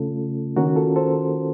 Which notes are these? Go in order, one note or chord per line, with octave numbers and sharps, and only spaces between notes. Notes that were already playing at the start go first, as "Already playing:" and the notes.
Already playing: C#3 A3 C#4 F4 A4
D#3 A#3 C#4 F#4 A#4
F4 A4
A4 C5